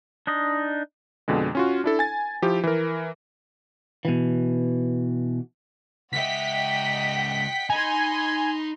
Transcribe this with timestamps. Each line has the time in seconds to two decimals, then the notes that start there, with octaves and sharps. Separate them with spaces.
0.27 D4 D#4 D#5
1.28 F2 B2 D3 G#3
1.55 C#4 F4 F#4
1.84 D4 E4 A4
1.99 G#5 A6
2.42 F3 E4 G4
2.63 E3 A#4
4.05 B2 E3
6.13 C#2 D#5 E5 F#5 G5 B6
7.70 D#4 G#5 B5 C6